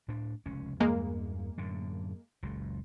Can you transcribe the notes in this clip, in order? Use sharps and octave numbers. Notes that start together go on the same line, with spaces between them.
A2 D4
F1 C#2 C#4
E2 G2 E3 G#3 A#3
F#2 A2 D3
F#1 C#2 A#2